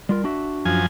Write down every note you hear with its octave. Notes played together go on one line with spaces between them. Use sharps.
G3 F4 A#4
D4 F#4 E5
F#2 F3 G#5